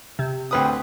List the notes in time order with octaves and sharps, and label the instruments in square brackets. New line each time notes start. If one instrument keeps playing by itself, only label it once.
[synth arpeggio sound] C3
[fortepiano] D2 B4 D#6 [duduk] C4